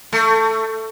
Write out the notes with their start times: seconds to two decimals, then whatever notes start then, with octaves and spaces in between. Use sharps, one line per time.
0.13 A3